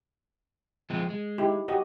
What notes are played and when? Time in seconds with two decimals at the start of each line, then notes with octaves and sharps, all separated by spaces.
0.90 F3 G#3 C4
1.10 G#3
1.38 D#4 E4 G4
1.68 F#4 G4 D#5